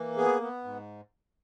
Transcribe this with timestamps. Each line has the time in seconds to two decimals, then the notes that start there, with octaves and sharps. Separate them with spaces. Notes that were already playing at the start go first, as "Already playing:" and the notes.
Already playing: E3 A#3
0.17 B3 G#4
0.41 B3
0.64 G#2